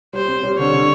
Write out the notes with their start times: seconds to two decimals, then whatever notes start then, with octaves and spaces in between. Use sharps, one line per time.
0.13 G3 C5
0.28 C4
0.43 G3
0.58 D3 C#5
0.73 D3